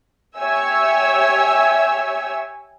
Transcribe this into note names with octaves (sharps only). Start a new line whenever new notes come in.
G4 C#5 E5 G#5 E6